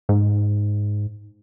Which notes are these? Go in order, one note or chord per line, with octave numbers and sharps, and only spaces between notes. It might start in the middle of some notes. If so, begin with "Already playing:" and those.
G#2